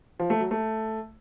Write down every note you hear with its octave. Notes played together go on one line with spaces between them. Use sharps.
F3
A3
F#3
A3